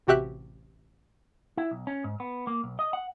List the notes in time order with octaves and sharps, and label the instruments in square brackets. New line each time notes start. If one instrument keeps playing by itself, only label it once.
[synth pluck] A1 C3 F#4 G4 E5 F#6
[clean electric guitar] E4
B1
C#4
G#2
B3
A#3
B1
D#5
F#5